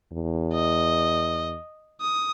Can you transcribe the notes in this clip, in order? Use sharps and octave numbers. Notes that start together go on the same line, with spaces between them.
E2
D#5
D#6